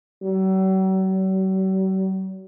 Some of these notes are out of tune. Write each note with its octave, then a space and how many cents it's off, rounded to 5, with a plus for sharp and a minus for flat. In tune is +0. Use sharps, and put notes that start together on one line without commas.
F#3 +45